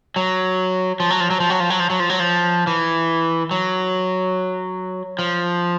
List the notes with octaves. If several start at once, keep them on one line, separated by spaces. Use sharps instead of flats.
F#3
F3
F#3
F3
F#3
F3
F#3
F3
F#3
F3
F#3
F3
F#3
F3
E3
F#3
F3